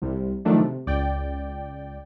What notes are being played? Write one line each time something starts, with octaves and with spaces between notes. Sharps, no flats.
C2 C3 G3
D#3 F3 F#3 A3 D4 D#4
C3
C#2 D5 G5